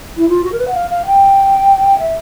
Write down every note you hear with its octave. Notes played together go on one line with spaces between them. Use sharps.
E4
F4
F#4
A#4
B4
F#5
F5
F5
G5
E5